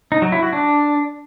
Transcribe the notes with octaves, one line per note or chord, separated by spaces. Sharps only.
D#4
F#3
E4
F#4
D4